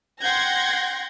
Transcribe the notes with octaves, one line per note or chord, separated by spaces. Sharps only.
F#5 G5 C6 G6 G#6 A#6